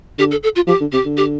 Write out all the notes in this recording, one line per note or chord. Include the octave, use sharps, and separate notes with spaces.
D3 G4
A4
A4
F4
F3 G4
D3
C3 G4
D3
G4